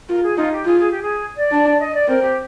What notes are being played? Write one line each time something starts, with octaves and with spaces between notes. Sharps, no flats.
F4 A#4
G#4
D#4 F4
G4
F4 G#4
G#4
G4
G#4
D5
D4
D#5
D5
C4 A#4
G4